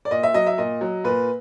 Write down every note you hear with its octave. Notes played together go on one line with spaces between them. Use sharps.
D5
A#2 D#5
E5
F#3 D#5
E5
A#2 D#5
F#3
A#2 B4